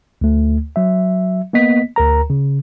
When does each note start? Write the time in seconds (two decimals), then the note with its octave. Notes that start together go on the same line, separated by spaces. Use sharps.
0.21 D2 A3
0.76 F#3 E5
1.53 A#3 B3 D#5 B6
1.96 D2 A#4 A#5
2.30 C#3